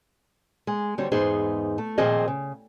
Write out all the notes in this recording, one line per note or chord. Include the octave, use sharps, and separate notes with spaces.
G#3
D3 G3 C4 F#4 C#5
E2 G#2 B3 D#4 G#4 C5
A3
A#2 D#3 F3 C4 G#4 D#5
C#3